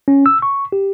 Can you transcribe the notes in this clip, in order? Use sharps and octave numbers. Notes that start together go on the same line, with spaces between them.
C#4
E6
C#6
G4